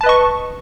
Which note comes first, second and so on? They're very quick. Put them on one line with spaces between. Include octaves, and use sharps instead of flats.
A5 B4 D#5 C#6